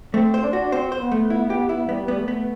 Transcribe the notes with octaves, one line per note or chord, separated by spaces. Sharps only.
A3 C4
C5
D4
F#4
C4 C5
C5
B3
A3
E4
G4
E4
G3 B3
B3
A3
B3